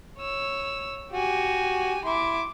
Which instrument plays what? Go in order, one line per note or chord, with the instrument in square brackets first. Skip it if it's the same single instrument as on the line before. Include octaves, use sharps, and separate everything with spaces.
[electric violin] C#5 E6
[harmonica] F#4 [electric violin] G4 G#5
[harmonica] E4 [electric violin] C6 D6